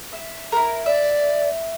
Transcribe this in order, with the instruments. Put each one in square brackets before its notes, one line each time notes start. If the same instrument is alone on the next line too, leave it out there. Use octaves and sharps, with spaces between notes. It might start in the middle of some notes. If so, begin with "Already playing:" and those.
[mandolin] E5
E4 A#4
[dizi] D5 [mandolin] E5